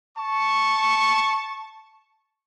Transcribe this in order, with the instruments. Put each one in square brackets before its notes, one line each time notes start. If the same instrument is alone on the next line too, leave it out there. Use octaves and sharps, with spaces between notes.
[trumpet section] A5 C#6